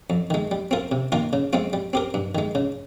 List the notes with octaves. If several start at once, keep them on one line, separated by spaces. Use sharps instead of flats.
F2
D#3 G#3
G3
C4 F4 A#4
C3
D#3 A#3 F4 A#4
C#3
G#3 C4 F4
G3
C4 G4 A#4
G2
D#3 G#3
C#3